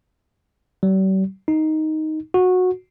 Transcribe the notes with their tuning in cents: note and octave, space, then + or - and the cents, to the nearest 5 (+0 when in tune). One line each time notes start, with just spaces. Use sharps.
G3 -45
D#4 +5
F#4 -15